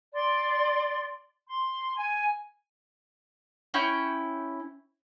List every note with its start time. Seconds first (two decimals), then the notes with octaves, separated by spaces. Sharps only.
0.14 D5 C6
1.48 C6
1.95 G#5
3.74 C#4 E4 G5